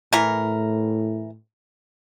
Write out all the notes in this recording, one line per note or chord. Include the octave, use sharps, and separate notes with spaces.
A2 E3 A#4